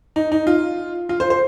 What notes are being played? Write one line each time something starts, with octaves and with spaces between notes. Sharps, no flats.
D#4
D#4
F4
F4
C5
C5